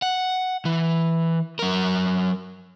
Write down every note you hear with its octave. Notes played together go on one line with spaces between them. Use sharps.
F#5
E3
F#3 A#4